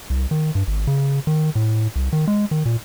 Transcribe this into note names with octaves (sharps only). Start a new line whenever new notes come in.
C2
D#3
G2
G#1
C#3
D#3
A2
C2
D#3
G#3
D#3
A#2